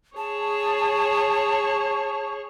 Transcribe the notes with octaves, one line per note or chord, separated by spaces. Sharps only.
G#4 C#5 A5